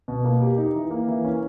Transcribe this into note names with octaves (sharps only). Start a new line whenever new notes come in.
B2
A#3
G4
D#4
E3
A#3
E3
C#4